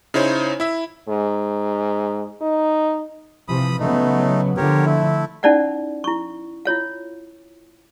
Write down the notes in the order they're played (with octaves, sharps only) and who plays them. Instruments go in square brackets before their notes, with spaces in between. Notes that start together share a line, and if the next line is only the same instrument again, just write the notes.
[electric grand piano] C#3 D#4 E4 C5 C#5
E4 E5
[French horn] G#2
D#4
[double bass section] C3 E3 F3 [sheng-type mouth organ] B5 D#6
[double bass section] C#3 F#3 B3 [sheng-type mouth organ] A3 D#4
[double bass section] D3 F3 [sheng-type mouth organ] G4 A#4 C#5
[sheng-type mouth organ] A3 E4
[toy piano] C#4 D#4 E4 D5 F5 F#5
E4 C#6
E4 F4 C#5 F5